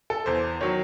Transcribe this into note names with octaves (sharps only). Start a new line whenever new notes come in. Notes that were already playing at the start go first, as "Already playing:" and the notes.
A4
E2 C5
D#3 F#3 C#5